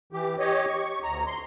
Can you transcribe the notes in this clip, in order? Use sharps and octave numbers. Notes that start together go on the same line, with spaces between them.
E3 G4
G4 C#5 D#5
C#6
D2 A#5
C6